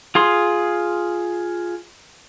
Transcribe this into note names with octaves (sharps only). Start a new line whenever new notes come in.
F4 G#4 C6